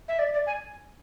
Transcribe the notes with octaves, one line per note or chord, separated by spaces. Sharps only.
E5
D5
D5
G#5